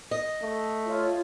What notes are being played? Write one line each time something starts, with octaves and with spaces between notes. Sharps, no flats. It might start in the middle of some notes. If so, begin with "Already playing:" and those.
D#5
A3
F4 C#5